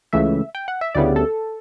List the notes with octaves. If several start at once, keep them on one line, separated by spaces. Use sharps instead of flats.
C#2 C#3 E3 A3 E5
G5
F#5
E5
D2 C#3 G3 B3 E4 D5
A4